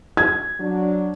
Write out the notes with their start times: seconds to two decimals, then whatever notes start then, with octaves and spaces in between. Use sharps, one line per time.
0.17 G#6
0.60 F#3 D4